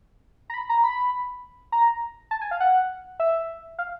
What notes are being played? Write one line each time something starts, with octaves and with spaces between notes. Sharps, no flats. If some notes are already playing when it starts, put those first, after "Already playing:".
A#5
B5
A#5
B5
A#5
A5
G#5
F5
F#5
E5
F5